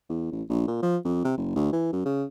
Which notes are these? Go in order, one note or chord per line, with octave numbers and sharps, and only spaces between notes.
E2
A1
A#1
A#2
F3
F2
C3
F#1
D2
E3
F#2
C#3